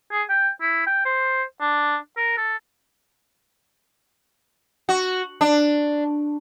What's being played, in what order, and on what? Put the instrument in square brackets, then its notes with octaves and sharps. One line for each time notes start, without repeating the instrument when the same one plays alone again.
[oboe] G#4
G5
E4
G5
C5
D4
A#4
A4
[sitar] F#4
D4